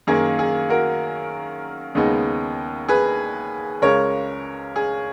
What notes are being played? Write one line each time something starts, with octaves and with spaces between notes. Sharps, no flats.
F#2 D#3 A#3 G#4
G#4
F#4 A#4
D#2 C#3 G#3 B3 D#4
G#4 B4
C#2 C#3 G#3 A#4 C#5
G#4